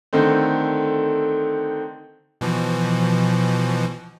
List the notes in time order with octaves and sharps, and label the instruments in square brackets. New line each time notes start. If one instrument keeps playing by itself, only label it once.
[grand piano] D3 D#3 A3 C4
[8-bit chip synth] B2 E3 F3